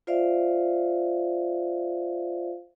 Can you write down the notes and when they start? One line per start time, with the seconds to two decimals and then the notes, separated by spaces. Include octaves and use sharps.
0.07 F4 C5 D5 E5 F5